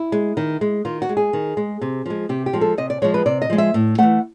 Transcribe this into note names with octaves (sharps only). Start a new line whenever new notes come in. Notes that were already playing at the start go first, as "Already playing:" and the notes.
Already playing: E4
G#3
D#3
G#3
D#3 F4
F#4
G#3
G#4
D#3
G#3
C3
F3 G#3
C3 G4
G4
F3 G#3
A4
C3 D#5
D5
F3 G#3 C#5
B4
C3 D5
D#5
F3 G#3
E5
A2
E3 A3 F#5